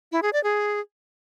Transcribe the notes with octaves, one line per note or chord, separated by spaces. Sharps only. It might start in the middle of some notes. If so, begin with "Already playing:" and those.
E4
G#4
D5
G#4